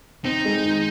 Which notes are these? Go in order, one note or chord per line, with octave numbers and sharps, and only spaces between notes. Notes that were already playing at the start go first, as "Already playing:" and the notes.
C4 D#4
G#3
D#3